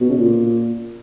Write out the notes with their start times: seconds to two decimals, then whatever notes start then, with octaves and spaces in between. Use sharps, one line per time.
0.01 B2
0.09 C#3
0.18 A#2